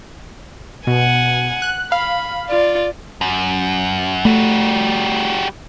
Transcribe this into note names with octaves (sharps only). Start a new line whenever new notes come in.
B2 F#5 G#5
F#6
F5 B5
F4 D5
F#2
G3 A3 F#4